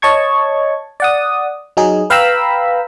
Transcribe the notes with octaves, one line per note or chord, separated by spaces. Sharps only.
C#5 D#5 A5 C#6 G#6
D5 F#5 D#6
F#3 D#4 G#4
B4 F5 G5 A#5 B5 E6